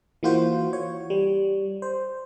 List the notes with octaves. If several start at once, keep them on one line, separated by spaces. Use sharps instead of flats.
E3 A#3 F4 F#4 C5
C#5
G3
C5